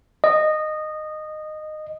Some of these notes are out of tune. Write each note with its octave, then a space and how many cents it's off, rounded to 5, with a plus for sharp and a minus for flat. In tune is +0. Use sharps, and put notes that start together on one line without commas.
D#5 -15